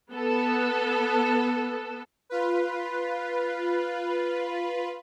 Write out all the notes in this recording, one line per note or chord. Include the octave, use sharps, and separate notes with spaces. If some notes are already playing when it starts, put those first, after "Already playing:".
B3 A4
F4 B4